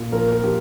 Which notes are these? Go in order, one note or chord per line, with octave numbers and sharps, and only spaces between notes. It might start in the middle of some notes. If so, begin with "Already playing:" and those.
Already playing: A#2
F3 A#4
A#4
F3 G4